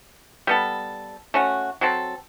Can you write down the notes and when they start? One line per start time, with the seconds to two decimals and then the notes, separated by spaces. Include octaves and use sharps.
0.47 G3 B3 A4
1.34 A3 C#4 F#4
1.81 F#3 C4 A4